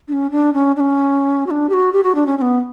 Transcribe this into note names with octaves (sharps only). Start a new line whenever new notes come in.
D4
C#4
D4
C#4
D4
C#4
F#4
D4
G4
F#4
G4
F#4
D4
C#4
C#4
B3